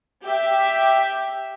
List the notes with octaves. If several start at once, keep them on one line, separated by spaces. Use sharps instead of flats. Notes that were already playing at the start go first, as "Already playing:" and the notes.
G4 E5